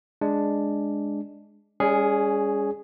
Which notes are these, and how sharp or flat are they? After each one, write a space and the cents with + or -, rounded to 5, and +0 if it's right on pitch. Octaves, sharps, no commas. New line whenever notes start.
G#3 +0 D4 +0
G3 +40 C#4 +20 G#4 +0